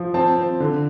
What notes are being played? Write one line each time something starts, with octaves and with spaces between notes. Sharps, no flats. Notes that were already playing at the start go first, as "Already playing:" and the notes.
Already playing: F3
C4 A5
C4
D3